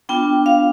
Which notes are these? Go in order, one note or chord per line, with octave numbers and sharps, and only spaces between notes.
B3 D4 F4 G5
F5